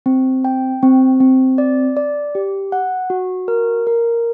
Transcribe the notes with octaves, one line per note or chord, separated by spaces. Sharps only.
C4
G5
C4
C4
D5
D5
G4
F#5
F#4
A#4
A#4